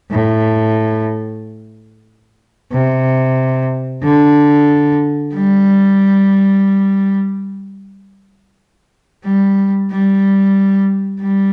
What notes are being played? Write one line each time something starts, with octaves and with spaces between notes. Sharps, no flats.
A2
C3
D3
G3
G3
G3
G3